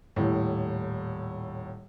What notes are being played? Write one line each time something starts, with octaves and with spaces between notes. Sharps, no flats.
D#1 A2